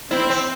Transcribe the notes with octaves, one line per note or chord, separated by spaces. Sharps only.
C4 E4
C4